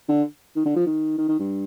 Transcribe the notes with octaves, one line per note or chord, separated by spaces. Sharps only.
D3
D#3
D3
F3
D#3
D#3
D#3
G2